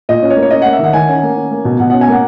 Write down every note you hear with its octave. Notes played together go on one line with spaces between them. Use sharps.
A#2 D#5
C#4
C#5
A#3
C#5
C#4 D#5
A#3 F#5
E5
D#3 F#5
D#3 G#5
C#4
A#3
C#4
A#3
B2
B2 F#5
C#4 F#5
G#5
A#3 F#5